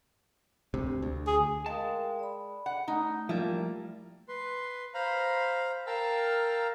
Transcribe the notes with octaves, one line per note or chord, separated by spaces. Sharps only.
D2 C3
D2
G#4
G#3 A#4 F5 G5 A5
D5 B5
F#5
A3 D#4
F3 G3 A#3 E4 F4
B4 C6
C5 F5 A#5 B5
A#4 F5 G5 A5 A#5 E6